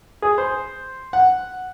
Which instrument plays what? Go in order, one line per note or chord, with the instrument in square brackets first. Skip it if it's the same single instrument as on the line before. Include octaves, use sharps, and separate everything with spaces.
[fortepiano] G#4
C5
F#5